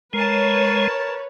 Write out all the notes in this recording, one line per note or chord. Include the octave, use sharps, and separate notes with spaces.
G#3 A#4 B4 C#5 A5